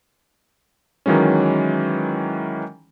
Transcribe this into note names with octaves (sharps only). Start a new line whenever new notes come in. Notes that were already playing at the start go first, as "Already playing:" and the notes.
D#3 E3 F#3 G#3 C#4